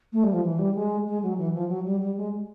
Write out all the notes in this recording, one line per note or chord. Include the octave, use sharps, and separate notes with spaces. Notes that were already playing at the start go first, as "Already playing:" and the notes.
A3
G3
F3
E3
G3
G#3
G#3
F#3
E3
F3
F#3
G3
G3
G#3